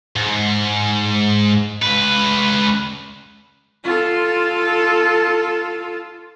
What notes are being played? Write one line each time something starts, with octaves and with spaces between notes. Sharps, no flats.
G#2
C#2 B4
F4 A4